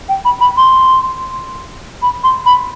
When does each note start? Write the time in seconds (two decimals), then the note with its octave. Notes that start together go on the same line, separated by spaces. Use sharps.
0.09 G5
0.25 B5
0.41 B5
0.57 C6
2.02 B5
2.24 C6
2.46 B5